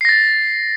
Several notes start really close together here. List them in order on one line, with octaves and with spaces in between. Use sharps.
C7 A#6 A6